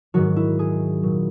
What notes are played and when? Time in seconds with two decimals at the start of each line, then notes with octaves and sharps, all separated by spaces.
0.14 G#2 D#3 F#3 F#4
0.36 E4
0.59 G#4
1.03 A#2 F#3